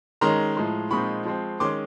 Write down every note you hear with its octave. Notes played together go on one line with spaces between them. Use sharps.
D#3 G#3 C#4 A#5 C6
A2 F3 G#3
A#2 F3 G#3 C4 D#4 B5 C#6
F3 G#3 C4
D#3 G#3 C#4 C6 D6